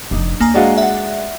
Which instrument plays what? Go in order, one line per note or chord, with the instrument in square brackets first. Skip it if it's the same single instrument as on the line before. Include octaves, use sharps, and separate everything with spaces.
[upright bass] F1 F2 [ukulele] D4 D#4
[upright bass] D2 [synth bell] A#3 G#5 A#5
[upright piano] G#3 D4 F#4 [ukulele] D5 D#5 F5
[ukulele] D5 F#5 [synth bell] E5